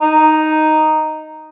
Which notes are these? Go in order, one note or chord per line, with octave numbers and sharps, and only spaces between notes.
D#4